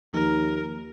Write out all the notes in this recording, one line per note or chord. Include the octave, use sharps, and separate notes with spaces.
D#2 F3 A#3 D#4 A#4